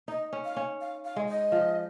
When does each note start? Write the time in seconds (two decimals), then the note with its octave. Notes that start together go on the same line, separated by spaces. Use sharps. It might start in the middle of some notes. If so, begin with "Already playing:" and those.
0.08 D#4 D#5
0.33 C#4
0.45 F5
0.56 C#4
0.81 F5
1.05 F5
1.16 G#3
1.29 D#5
1.52 F3